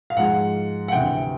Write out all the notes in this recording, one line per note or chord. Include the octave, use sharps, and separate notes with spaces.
F5
G#2 F3 G#3 F#5
F#5
D2 C3 E3 G5